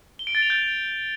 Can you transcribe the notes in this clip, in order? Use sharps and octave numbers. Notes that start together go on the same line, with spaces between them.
G7
D7
A6
F7
G6